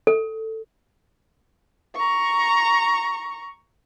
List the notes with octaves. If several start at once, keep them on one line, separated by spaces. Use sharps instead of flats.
A4
A#5 C#6